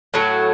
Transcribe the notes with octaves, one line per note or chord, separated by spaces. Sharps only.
A2 F#3 A3